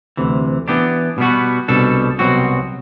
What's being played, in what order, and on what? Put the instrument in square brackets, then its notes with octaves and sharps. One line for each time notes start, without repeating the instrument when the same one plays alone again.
[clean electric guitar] D2 C3 E3
E3 B3 D4 G4
B2 G3 B3 F#4
C2 B2 G3 D4 A4
C2 B2 F#3 C4 F#4